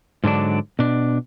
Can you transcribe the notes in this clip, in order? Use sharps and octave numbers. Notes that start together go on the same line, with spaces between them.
G#2 D3 F#3 D4
B2 D4